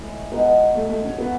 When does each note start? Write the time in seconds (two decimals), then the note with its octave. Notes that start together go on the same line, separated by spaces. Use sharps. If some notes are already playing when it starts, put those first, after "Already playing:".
Already playing: A2 E3 G#3
0.32 B2 G#3 B3 D#4
0.75 A3
0.89 A3
1.04 C#4
1.18 C#3 F#3 B3 C#4 E4